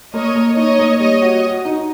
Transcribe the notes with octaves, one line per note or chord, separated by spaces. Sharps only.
A#3 C#5 D#5
A#3
D#4 C#5 D#5
A#3
G3 C#5 D#5
F#4
F#4
D#4